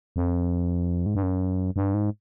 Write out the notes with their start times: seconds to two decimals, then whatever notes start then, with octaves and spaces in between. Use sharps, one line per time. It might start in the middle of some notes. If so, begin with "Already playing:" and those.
0.16 F2
1.06 G#2
1.15 G2
1.23 F#2
1.76 G2
1.94 G#2